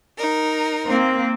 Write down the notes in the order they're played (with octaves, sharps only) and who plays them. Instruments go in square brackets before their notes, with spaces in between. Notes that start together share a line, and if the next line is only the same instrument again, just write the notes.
[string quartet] D#4 A#4
[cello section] A#3 C4